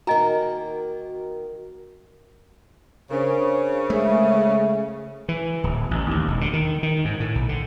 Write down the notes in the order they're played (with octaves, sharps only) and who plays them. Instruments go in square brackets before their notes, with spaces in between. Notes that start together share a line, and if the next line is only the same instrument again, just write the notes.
[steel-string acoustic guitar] D#3 A#3 [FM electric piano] F#4 A#4 [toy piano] D#5 G#5 A#5
[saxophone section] C#3 [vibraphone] D4 [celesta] A#4 C5
[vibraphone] G#3 G#4 E5 [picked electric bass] A3
[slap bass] E3
D1
A1
D#2
E1
D3
D#3
D#3
G#2
A2
B1
D3